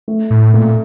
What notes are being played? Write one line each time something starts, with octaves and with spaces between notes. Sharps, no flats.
A3
A2
A#2 A3